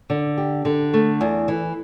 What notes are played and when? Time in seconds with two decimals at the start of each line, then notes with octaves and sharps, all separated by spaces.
0.10 D3
0.38 G4
0.65 D3
0.94 A3
1.21 E2
1.48 E3